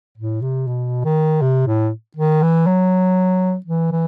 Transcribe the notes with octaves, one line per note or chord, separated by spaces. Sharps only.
A2
C3
B2
D#3
C3
A2
D#3
E3
F#3
E3
E3